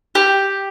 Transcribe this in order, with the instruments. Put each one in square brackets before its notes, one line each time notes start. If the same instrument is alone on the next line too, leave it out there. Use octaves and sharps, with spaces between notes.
[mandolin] G4